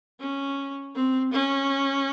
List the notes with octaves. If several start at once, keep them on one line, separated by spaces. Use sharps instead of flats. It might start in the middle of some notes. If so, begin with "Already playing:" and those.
C#4
C4
C#4